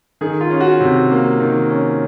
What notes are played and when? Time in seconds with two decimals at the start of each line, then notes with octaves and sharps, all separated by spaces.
0.21 D#3 G#4
0.41 F4
0.50 C#4
0.61 F#4
0.81 C3
1.11 A#3
1.40 D#3
1.70 C#4